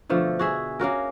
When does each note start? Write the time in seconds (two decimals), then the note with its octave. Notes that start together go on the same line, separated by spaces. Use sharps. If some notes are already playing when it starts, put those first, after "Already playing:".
0.09 B2 D3 F3 A3
0.39 F#4 G#4 E5
0.80 A#3 C#4 F#4 A#4